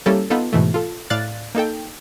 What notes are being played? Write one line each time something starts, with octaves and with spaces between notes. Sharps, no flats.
G3 A#3 C#4 E4 G4 A4
B3 D#4 F4 A4
G#2 B2 E3 A3
F4 A4
A2 D5 F5 F#6 A6
A#3 D#4 A4 G5